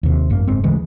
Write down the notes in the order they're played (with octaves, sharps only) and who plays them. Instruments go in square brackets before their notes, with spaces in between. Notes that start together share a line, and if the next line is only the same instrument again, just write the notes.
[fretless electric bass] D#2 C3
G#1 F#2 A#3
F#1 G#2 C4
D2 C#3 E3 G#3